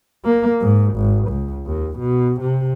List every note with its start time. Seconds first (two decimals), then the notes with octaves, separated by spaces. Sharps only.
0.25 A#3
0.61 G#2
0.95 G#1
1.29 C#2
1.66 D#2
1.99 B2
2.41 C3